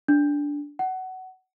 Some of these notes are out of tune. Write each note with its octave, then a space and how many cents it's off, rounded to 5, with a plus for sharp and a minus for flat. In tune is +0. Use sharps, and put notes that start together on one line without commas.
D4 -10
F#5 +20